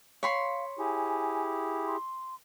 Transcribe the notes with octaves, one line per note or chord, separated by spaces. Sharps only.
C#5 F5 B5 C6
E4 G4 G#4 G#5
C6